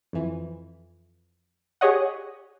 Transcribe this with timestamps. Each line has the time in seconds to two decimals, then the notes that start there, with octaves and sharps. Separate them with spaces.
0.13 F2 E3
1.81 G4 G#4 C#5 D#5 F#5